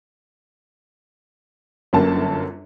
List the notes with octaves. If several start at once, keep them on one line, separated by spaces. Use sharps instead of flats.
G1 F#2 A#3 A5